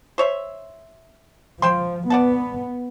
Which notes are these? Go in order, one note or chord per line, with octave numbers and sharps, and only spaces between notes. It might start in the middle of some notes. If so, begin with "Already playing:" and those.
C5 C#5 E5
F3 C5 G5 C6
B3 D5 F#5 A5